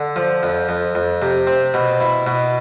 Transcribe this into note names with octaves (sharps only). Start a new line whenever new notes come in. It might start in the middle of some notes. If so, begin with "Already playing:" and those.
Already playing: D3
F3
F2
F2
F2
C3
C4
B2
E4
B2